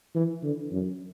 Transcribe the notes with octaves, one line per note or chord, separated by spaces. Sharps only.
E3
D3
F#2